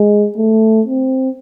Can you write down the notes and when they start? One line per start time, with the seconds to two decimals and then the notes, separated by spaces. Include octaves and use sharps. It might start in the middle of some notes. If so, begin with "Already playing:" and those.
Already playing: G#3
0.38 A3
0.86 C4